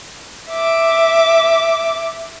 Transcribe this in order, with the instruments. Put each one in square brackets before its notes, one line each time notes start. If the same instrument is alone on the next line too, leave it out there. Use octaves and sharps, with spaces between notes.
[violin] E5 D6